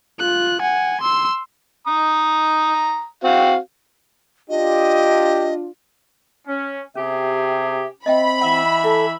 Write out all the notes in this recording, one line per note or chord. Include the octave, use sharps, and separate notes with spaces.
F4 F#6
F#5 G#5
C6 E6
A#5 D#6
C4 F#4 F5
D4 F4 G4 D#5
C#4
C3 C#4 G4 G#4 E5
C4 D#5 E5 G5 B5
E3 E5 F#5
E4 A4